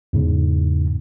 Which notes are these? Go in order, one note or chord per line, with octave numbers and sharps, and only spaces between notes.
E2 G#2 C#3